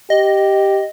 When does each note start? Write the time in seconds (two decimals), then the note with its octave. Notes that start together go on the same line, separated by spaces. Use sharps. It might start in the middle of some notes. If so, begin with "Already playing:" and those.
0.10 G4 D#5